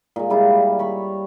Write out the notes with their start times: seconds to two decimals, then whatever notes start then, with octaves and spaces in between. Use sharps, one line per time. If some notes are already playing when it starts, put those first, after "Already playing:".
0.16 A#2 G#3
0.30 G3 E4 F4
0.79 C#5 B5 C#6